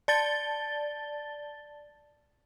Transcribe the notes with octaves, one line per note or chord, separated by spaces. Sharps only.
D5 A5 A6 G7